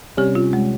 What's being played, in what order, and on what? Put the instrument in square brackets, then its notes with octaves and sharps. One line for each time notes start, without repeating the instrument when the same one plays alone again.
[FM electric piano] C3 G3 C#4 [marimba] G4
[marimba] F4
G#3